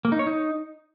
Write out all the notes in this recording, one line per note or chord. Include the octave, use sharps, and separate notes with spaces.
A#3
D#4
C#5
D#4